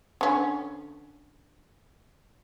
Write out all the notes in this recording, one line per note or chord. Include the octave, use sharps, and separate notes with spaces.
D3 C#4